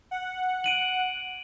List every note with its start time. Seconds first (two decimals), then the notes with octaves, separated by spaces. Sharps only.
0.11 F#5
0.64 D7 D#7 F#7